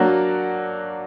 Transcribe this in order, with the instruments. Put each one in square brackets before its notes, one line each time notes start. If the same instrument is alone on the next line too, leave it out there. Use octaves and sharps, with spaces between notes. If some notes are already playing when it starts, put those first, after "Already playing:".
Already playing: [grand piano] F#3 A#3 D4 F#4